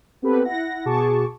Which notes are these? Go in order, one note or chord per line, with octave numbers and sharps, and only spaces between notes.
B3 C4 G4 A4 B4
E4 F#5 A#6
B2 F#4 G#4 A5 C#6 D6